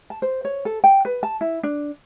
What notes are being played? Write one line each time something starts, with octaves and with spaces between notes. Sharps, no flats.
A5
C5
C#5
A4
G5
B4
A5
E4
D4